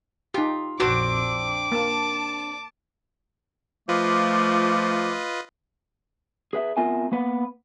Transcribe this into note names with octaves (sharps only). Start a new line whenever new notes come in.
D#4 F4 G4
A#1 F2 C4 D4 F#4 D5 D6
A#3 A5
F3 A3 F4 B4 D#5 D6
G#4 B4 E5
B3 C4 F4 A#4 E5 G#5
A#3 B3 B4 F#5